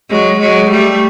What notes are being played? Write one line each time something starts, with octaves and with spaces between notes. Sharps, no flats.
F#3 G#3
F#3 G#3
G3 A3